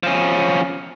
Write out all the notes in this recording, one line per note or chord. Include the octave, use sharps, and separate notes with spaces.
F3 C#4